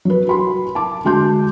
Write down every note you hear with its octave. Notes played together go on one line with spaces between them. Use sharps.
F#3 B4
F#4 B5 C6
A5 D6
D3 G#3 F#4 A5 C6 G6